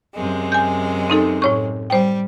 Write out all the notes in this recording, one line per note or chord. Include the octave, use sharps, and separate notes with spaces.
F#2 C3 G#3
G#5 G6
C4 D#4 A4
A2 C#5 C#6
G3 C5 G5